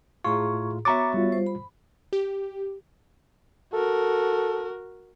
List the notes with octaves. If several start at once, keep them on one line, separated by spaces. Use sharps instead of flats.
A2 F4 G#4 A#5 C#6
B3 F#4 C#5 E5 A#5 C#6 D6 A6
G3 F4
C5
B5
G4
F#4 A4 A#4